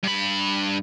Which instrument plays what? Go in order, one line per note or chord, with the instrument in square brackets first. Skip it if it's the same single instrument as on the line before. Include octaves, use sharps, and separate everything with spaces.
[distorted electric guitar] G2 B5